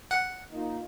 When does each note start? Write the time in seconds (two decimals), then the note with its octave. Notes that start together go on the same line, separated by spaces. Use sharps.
0.11 F#5
0.52 A#3 D#4 F4